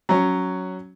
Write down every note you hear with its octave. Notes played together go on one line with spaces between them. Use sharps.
F#3 C#4